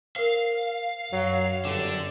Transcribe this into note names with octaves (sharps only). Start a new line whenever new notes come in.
A#4 C5 F5
F#2 F#3
G1 D3 C#5 G5